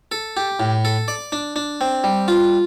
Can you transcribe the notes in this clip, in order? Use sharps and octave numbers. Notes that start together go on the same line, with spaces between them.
A4
G4
A2
A4
D5
D4
D4
C4
G3
F4